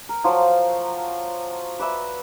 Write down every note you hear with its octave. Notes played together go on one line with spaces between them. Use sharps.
A#4
F3 F#3 F4
B4 D5 E5 B5